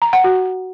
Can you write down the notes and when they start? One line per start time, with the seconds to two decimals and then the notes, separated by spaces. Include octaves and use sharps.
0.02 A#5
0.13 F#5
0.24 F#4